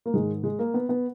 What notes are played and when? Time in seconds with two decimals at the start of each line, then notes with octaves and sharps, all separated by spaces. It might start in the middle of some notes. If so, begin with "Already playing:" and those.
0.06 A#3
0.14 G#2 D#3 G#3
0.44 G#3
0.59 A#3
0.74 B3
0.89 B3